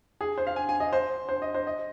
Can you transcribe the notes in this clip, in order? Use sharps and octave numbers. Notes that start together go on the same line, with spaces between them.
G#4
C5
F5
G#5
G#5
D#5
C5
C5
D#5
C5
D#5